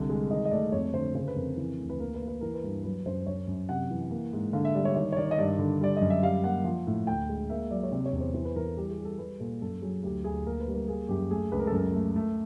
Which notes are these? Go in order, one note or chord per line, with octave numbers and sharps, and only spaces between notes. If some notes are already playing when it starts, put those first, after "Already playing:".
Already playing: C2 D3
G#3
D#3 D#5
D#5
A3 D5
F2 C#5
D3 C5
C#3 C5
B4
F2 A#4
E3
D2
B4
A#3 A#4
B4
A#3
B4
E3 A#4
B4
G2
F#3 B4
F#2 C5
F#2 C#5
F#2
C3 F#5
E3
A#3
G#2
D3 F5
E5
G3 D5
C#5
D#3 C#5
C#5
D#3 D5
D#5
G2 D5
D3
G3 D5
F#2 D#5
E5
G3 F5
A#3 F#5
F3
A2
D2 G5
G#3
A#3 E5
F#3 D5
C#5
C3 D5
C#5
E2
C5
E3 C5
B4
E3 A#4
A4
G3 G4
G#4
G3
A4
G3 B4
A#2 A4
F#2 A4
F#3 G#4
D2 G4
D2 G#4
A#3 A#4
B4
G3
A#4
A#3 G#4
F#2 G4
A3 G#4
C#2 B4
A#4
A4
F#2 A#4
A3
A3